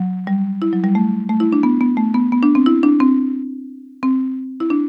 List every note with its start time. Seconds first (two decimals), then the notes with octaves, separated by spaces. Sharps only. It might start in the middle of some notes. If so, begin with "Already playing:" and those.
Already playing: F#3
0.27 G3
0.62 E4
0.73 F#3
0.84 G3
0.95 A3
1.29 A3
1.40 E4
1.53 D4
1.63 B3
1.81 B3
1.97 A3
2.14 B3
2.32 B3
2.43 D4
2.55 C4
2.66 E4
2.83 D4
3.00 C4
4.03 C4
4.60 E4
4.70 D4